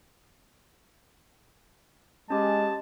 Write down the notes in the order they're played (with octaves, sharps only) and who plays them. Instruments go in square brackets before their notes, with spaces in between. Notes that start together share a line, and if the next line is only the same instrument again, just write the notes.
[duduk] G#3 [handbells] C#4 G4 [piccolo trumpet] A5